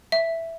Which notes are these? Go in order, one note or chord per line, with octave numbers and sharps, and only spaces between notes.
E5